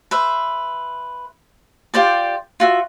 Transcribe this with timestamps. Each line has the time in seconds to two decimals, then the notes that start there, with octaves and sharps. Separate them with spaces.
0.11 B4 C5 E5
1.94 F4 G4 C5 D5
2.60 F4 F#4 E5